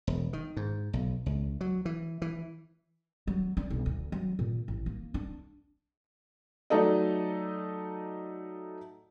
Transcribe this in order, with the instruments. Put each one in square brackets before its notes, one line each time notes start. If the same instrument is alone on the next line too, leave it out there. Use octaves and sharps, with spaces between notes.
[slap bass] E1
D#3
G#2
B1
C#2
F#3
E3
E3
[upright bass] F#3
D4
B1
D2
F#3
A#2
A1
A#3
D4
[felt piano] F#3 A3 D#4 A4 D5 D#5